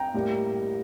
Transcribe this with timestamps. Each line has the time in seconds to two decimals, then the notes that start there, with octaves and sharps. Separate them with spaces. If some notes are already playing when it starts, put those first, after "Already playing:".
Already playing: G5 A#5
0.14 A2 G3 A#3